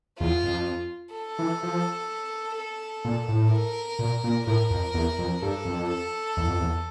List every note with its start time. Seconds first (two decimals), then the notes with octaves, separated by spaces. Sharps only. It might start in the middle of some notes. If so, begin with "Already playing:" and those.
0.20 E2 F4
0.44 F2
1.15 A4
1.39 E3
1.63 F3
2.57 A4
3.05 A#2
3.28 A2
3.51 A#4
3.99 A#2
4.24 A#2
4.47 A2 A#4
4.70 F2
4.94 E2
5.19 F2
5.41 G2 A4
5.65 F2
5.89 A4
6.37 E2
6.48 F2
6.61 E2